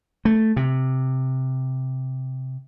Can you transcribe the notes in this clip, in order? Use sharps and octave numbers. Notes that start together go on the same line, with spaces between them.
A3
C3